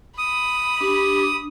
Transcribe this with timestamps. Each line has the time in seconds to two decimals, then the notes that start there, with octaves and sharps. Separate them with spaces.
0.18 B5 D#6
0.81 D4 G4